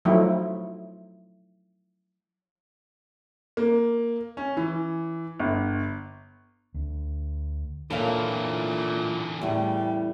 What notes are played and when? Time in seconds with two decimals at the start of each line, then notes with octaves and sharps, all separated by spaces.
0.05 F3 F#3 A3 D#4 E4
3.57 A#3
4.37 C#4
4.57 E3
5.40 G1
6.74 D2
7.90 A#2 D3 E3 A4 C#5 F5
9.41 E2 A2 C#3 G3